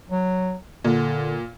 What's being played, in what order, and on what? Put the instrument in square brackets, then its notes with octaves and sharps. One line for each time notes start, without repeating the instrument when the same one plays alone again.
[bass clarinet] F#3
[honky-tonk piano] A#2 [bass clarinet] D3